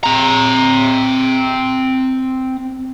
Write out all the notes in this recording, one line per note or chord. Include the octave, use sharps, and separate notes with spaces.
C4 A#5